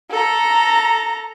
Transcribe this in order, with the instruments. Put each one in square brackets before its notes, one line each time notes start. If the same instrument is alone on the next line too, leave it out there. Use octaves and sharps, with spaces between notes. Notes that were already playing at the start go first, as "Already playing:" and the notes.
[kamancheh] A4 A#5